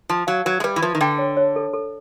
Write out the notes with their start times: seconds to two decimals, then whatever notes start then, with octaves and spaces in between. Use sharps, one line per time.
0.09 F3 A5
0.27 F#3 F5
0.45 F#3 B4
0.60 G#3
0.64 G3 B4
0.76 E3
0.82 F3 B4
0.95 D#3
1.01 D3 G5
1.19 C#5
1.37 C#5
1.56 A4
1.73 A4